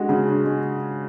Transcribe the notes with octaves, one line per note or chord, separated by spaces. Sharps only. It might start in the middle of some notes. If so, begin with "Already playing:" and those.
Already playing: G#3 D4 F#4
C#3
D4
G#3